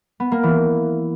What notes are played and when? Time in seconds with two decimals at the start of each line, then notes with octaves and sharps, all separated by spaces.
0.20 B3
0.32 A#3
0.43 E3